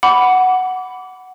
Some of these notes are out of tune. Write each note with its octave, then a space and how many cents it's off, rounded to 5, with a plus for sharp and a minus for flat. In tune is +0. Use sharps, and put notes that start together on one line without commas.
F#5 +5 B5 +0 D6 -30